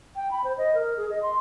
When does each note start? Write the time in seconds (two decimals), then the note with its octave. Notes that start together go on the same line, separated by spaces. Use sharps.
0.16 G5
0.31 B5
0.44 C5
0.58 D#5
0.75 A#4
0.97 G#4
1.10 D#5
1.23 C6